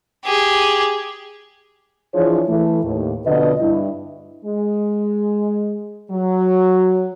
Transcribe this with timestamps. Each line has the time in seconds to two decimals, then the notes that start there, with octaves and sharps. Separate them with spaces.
0.25 G4 G#4
2.14 E3 F3 D4 G#4 C#5
2.48 E3 A3
2.84 D#2 A2
3.26 F2 B2 D3 B3 B4 D#5
3.61 G2 E4
4.45 G#3
6.11 F#3